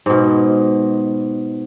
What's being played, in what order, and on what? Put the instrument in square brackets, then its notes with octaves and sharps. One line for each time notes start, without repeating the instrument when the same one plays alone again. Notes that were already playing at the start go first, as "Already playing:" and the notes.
[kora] G#2 B2